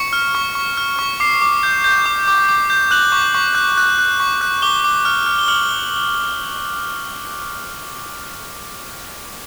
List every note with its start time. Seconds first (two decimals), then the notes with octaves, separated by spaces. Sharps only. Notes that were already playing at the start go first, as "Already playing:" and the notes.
Already playing: C#6 C#7
0.13 F6
0.35 C#6
0.55 C#6
0.78 F6
0.99 C#6
1.20 D6 C7
1.42 D6
1.63 G6
1.84 G6
2.06 D6
2.28 D6
2.49 D6
2.70 G6
2.91 F#6 F#7
3.12 C#6
3.35 C#6
3.55 F#6
3.77 F#6
3.99 F#6
4.20 C#6
4.41 F#6
4.62 D6 G7
4.84 D6
5.05 F6
5.26 F6
5.39 G7
5.48 F6 F#7